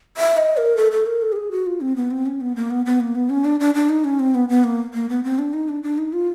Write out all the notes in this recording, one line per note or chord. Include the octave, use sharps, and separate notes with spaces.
E5
D#5
A#4
A4
A4
A#4
A4
G4
G#4
F#4
F4
C4
B3
C4
C#4
B3
A#3
B3
B3
A#3
B3
C#4
D4
D4
D4
D#4
C#4
C4
B3
B3
A#3
A#3
B3
C4
D4
D#4
D4
D4
D#4
F4